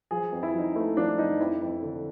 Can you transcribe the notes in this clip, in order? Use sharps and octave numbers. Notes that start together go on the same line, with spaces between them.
F3 G#4
F2
E4
F3 D#4
A3 E4
F3 D4
F2 D#4
F2 E4
F2
D3